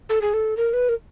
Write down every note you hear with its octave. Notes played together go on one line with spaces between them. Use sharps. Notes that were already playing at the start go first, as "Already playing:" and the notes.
A4
G#4
A4
A#4
B4
A#4